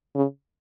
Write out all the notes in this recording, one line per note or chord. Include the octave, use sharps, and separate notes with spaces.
C#3